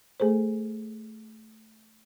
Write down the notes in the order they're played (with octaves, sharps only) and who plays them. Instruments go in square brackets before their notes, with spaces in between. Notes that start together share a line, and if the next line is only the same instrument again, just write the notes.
[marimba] A3 G#4 A4 C5